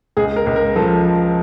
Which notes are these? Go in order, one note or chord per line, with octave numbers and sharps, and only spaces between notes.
C#2 G#4
A#4
C#2
A#4
F3 A4